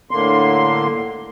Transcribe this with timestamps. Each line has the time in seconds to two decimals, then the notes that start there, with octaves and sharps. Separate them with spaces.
0.11 A2 D3 A#3 C6